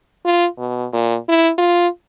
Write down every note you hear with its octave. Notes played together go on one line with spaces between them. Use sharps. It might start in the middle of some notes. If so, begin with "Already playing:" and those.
F4
B2
A#2
E4
F4